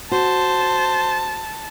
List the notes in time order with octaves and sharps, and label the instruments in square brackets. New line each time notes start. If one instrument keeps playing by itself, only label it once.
[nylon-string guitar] F#4 [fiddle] C5 [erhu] A5